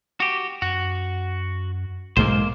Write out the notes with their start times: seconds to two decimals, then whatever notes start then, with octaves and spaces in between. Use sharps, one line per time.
0.20 F#4 G4
0.62 F#2 F#4
2.17 B1 G#2 G#3 A#3 C5